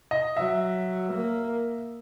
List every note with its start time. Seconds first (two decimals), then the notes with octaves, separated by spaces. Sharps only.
0.11 D#5
0.37 F#3 E5
1.13 A#3